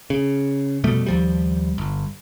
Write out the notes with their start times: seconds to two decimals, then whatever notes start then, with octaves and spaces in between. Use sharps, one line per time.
0.10 C#3
0.84 F1 B2 G3 A3
1.06 D#2 F3 G3
1.78 G1